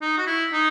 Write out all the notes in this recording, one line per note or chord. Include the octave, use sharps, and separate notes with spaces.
D#4
F#4
E4
D#4